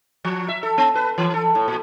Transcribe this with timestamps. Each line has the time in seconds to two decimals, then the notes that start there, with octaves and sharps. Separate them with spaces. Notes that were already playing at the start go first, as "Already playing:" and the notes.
0.25 F3
0.48 E5
0.63 A4
0.78 B3
0.95 B4
1.18 E3
1.34 A4
1.55 A2
1.68 A#2